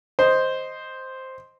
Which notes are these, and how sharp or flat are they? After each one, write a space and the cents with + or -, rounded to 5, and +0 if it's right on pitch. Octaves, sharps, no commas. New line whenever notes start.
C5 +0 D#5 +0